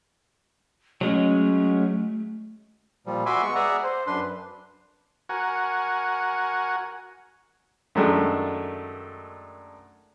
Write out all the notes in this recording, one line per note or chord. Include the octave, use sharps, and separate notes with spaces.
F#3 G#3 A3 C#4
A#2 F3 G3
F#4 E5 G#5 B5 C6 D6
G#3 B3 C#6
G#4 D5 E5 F#5 G#5 A#5
C5
F#2 D4 B4 C6
F#4 A#4 F#5 G#5
F#2 D#3 G#3 A3 D4